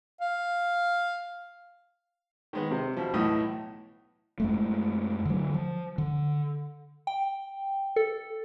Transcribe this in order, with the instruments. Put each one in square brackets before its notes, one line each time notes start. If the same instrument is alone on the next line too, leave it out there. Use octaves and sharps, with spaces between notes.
[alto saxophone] F5
[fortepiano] D#3 G#3 B3
C3 C4
B2 F3
B1 A2 E3 D#6
[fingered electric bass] F#2 G#3 A3
D3 F#3
F3
D3
[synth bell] G5
A4